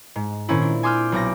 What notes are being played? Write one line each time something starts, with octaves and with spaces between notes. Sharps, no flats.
G#2
A#2 D#3 C4 C#4 E4
D4
G#5 C6 D6 E6 F6 G6
B1 D6 A#6